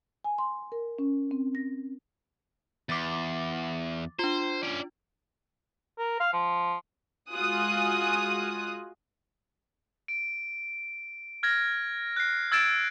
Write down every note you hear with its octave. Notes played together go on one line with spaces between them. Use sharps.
G#5
C6
A#4
C#4
C4
A#6
E2 D6 A6
D4 F4 C5
C#4 D5
A#4
F5
F3
G#3 F4 F#4 G#5 D#6 F#6
D7
F6 G#6 A#6
F#6 C7
E6 G#6 A6 D7 E7